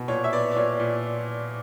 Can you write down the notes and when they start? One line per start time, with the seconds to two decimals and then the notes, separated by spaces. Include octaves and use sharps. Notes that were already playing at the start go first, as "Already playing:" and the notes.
Already playing: B2
0.08 A#2 C#5
0.24 E5
0.32 B3 D5
0.51 D5
0.56 A#2 C#5
0.79 A#2